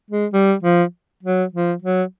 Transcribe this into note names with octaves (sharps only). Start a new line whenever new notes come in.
G#3
G3
F3
F#3
F3
F#3